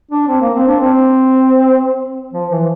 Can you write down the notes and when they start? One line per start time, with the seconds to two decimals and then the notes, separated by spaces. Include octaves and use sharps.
0.11 D4
0.28 C4
0.41 A#3
0.54 C4
0.67 D4
0.80 C4
2.33 F3
2.50 E3